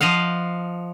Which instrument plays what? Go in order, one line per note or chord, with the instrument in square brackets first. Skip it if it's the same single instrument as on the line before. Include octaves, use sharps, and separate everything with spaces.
[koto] F3 D#5 F5 F#5